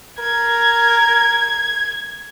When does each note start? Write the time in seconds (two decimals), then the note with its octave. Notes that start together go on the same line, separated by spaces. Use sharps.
0.19 A#4 G#6